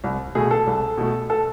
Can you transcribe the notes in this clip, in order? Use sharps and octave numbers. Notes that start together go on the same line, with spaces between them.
C2
B2 A3 G#4
A4
C2
B2 A3
A4